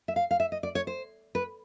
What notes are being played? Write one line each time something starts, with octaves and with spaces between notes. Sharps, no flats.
E5
F5
F5
E5
D#5
D5
C#5
C5
B4